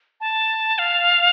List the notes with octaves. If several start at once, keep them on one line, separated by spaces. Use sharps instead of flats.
A5
F5